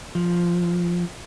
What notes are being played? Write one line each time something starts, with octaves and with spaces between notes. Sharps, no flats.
F3